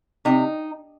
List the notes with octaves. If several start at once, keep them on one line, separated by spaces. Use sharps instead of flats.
C3 D#4